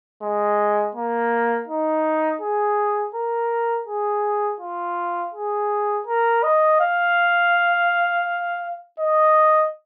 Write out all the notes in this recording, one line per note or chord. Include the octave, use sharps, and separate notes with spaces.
G#3
A#3
D#4
G#4
A#4
G#4
F4
G#4
A#4
D#5
F5
D#5